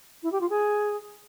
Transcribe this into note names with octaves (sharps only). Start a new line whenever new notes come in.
E4
G4
F4
G#4